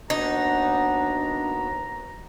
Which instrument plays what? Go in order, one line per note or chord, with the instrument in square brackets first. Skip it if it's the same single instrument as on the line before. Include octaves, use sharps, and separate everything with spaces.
[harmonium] D#2 B3 F#4 [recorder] D4 [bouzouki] D#4 [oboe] A#5